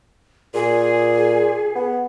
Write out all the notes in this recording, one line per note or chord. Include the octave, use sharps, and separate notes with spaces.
A#2 G#4
B3